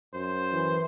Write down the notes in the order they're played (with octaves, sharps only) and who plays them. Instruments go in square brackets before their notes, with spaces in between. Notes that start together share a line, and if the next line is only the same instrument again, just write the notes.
[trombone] F#2 [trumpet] C5
[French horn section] E3